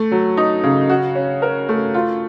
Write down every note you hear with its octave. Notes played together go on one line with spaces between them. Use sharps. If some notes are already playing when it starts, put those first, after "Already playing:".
Already playing: A3
F#3
D#4
C#3
F#4
C#4
A#4
A3
F4